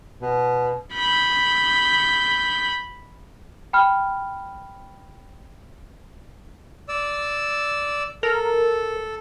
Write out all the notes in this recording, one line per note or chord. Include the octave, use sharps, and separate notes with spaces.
B2
B5 G6
G5 B5 F6
D5 E6
A4 A#4